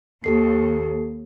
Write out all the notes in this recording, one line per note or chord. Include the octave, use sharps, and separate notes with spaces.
D#2 G4 A4 C7